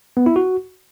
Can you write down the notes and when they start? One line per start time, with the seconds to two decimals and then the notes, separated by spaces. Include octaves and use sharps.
0.17 B3
0.26 E4
0.36 F#4